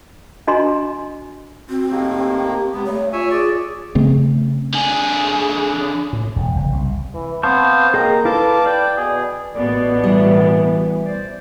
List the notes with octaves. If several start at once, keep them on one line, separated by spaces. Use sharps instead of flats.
D4 F#4 D#5 G#5 A#5 C6
C4 F#4
A2 D#3 A#3 G4
C3 G#3 B3
G2 A3 C#5
F4 C#5 E5 G#5
G#4 D5
C#3 A3 C4
D3 G#4
A2
E1
F#1
C2
E3
B3 C4 C5 F5 A5 C#6 G6
A#3 G#4 D#5 G5 A#5
E4 A4 B4 F5 A5 D6
D5 G5
B2 G#4
A1 B2 B3 D5
E3 G3
C5 D5